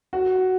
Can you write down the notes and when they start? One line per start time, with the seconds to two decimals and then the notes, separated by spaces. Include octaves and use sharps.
0.13 F#4